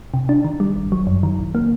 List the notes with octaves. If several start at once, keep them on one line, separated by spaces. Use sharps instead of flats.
C3
D4
D#3
G3
G1
F#3
F#2
D#3
A1
A#3